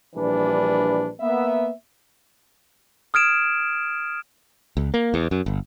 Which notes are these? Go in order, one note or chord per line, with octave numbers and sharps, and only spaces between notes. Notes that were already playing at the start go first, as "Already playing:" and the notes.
A#1 E3 G3 D4 B4
A#3 B3 E5
D#6 F6 G#6 D7 E7
C#2
A#3
E2
F#2
G1